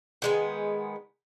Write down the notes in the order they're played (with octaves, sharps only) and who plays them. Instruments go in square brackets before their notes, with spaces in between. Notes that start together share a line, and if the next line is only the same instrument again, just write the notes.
[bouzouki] D#3 G#3 B3